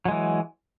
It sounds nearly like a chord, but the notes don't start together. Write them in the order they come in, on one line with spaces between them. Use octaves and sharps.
F#3 G#3 E3